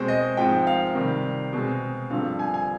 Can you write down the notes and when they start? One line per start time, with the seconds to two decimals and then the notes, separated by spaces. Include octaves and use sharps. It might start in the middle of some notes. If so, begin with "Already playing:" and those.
Already playing: B2 G#3 C4 C5
0.08 D#5
0.37 G#2 F3 C4 G5
0.67 F5
0.95 C3 D#3 G3
1.53 B2 G#3 C4
2.10 G2 D3 F3 C4 F5
2.39 G#5
2.54 G#5